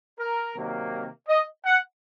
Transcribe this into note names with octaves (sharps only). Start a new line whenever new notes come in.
A#4
C3 D#3 F#3 A#3
D#5
F#5